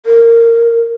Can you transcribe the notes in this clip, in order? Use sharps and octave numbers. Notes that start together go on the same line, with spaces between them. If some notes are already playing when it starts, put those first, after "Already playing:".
A#4